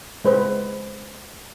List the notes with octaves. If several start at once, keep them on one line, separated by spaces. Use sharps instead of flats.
G#3 B4 C5